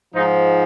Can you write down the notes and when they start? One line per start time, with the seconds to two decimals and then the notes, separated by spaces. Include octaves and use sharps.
0.14 G#2 F3 D#4